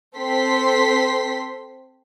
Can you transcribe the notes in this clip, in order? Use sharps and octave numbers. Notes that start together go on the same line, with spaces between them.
C4 A4 C5 C6 B6